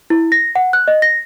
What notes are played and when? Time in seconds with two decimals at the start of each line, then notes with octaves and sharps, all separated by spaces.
0.10 E4
0.32 A#6
0.55 F#5
0.73 F#6
0.88 D#5
1.02 A#6